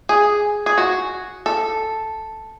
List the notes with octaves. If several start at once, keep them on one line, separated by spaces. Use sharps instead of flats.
G#4
G#4
F#4
A4